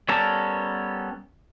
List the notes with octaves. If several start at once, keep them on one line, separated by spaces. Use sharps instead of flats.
G3 B3 C#4 A4 A#4